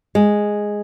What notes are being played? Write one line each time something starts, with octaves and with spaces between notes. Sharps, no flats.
G#3